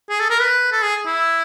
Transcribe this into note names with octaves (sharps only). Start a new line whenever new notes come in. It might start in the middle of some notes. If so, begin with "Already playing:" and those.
G#4
A4
A#4
B4
A4
G#4
E4